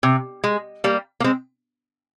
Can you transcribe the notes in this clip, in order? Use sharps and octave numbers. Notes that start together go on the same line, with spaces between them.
C3
G#3
G3 A#3
A#3
G#3 C4